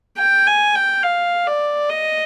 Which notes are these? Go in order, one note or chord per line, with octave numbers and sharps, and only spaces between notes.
G5
G#5
G5
F5
D5
D#5